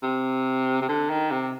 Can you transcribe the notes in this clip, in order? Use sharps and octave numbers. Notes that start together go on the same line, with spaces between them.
C3
C3
D3
D#3
C3